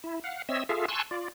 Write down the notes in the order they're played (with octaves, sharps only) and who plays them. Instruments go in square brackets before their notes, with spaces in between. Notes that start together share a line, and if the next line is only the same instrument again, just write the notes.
[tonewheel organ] E4
F5 F#5
C4 C#5 D#5 E5 E6
F4 G#4 A4 E5 F5
G#5 A5 C6 C#6 E6 F#6
F4 D5